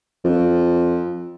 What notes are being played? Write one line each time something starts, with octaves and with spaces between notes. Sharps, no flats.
F2